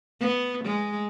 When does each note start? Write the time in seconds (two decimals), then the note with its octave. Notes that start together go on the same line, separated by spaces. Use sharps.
0.21 B3
0.64 G#3